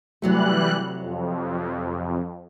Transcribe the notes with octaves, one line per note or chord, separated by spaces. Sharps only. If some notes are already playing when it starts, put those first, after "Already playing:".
C3 E3 F#3 G3 A3 F#6
F2